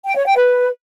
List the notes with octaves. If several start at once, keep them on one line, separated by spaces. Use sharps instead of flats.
G5
C#5
G5
B4